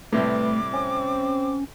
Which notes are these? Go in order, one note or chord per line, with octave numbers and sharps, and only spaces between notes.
A2 C3 G3 A3 B4 D6
C4 C#4